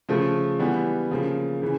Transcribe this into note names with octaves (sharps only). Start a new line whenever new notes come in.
C#3 F3 A3
E3 G3 B3
C#3 F3 A#3
C#3 E3